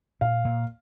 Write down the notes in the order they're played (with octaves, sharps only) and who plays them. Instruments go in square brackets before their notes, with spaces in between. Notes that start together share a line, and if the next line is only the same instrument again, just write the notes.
[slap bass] A#2 [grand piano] F5
[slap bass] A#2